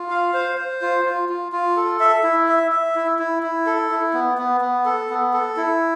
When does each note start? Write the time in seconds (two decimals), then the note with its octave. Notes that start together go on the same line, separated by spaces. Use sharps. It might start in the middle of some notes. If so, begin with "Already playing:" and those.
Already playing: F4
0.10 F5
0.34 C5
0.57 C5
0.81 F4
1.05 F4
1.29 F4
1.52 F4
1.77 A4
2.00 E5
2.23 E4
2.48 E5
2.72 E5
2.95 E4
3.19 E4
3.43 E4
3.66 A4
3.91 E4
4.13 B3
4.38 B3
4.61 B3
4.85 A4
5.09 B3
5.33 A4
5.57 E4